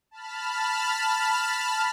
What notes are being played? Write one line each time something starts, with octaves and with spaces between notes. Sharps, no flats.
A5 B5 F6